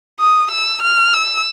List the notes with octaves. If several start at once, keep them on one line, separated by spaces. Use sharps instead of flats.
D#6
E6
F6
E6